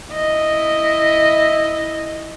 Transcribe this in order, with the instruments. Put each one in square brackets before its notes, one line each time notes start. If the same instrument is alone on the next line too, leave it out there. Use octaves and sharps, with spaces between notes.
[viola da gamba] E4 D#5